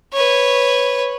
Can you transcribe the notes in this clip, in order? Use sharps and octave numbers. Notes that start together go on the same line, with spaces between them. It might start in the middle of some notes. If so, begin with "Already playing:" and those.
B4 C#5